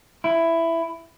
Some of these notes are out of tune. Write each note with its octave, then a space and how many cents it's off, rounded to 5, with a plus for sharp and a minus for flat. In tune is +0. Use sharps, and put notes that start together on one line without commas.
E4 +10